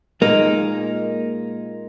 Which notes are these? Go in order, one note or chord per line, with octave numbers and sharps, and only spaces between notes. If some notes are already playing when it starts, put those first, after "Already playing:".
A#2 G#3 A#3 D#4